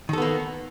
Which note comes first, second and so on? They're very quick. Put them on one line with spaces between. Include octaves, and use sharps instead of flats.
D#3 A4 B3 A#3